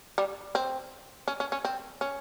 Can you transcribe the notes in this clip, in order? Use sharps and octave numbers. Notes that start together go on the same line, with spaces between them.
G3
C4
C#4
C#4
C#4
C4
C#4